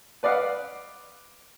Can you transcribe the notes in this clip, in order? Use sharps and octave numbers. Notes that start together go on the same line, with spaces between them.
B4 D5 D#5 F5 F#5